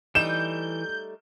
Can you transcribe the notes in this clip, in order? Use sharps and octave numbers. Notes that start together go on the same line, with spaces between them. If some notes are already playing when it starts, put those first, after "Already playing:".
E3 G3 A3 D#4 G6 E7